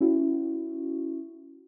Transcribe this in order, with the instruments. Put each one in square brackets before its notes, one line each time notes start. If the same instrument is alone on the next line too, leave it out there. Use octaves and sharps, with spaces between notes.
[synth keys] C#4 E4 F#4